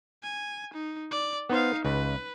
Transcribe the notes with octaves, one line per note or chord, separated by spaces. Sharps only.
G#5
D#4
D5
B3 D#4 C5 F5
C#2 B4